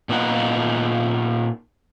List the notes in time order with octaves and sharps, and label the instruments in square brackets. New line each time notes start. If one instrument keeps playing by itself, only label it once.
[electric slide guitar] A#2 B3 D#4 F#5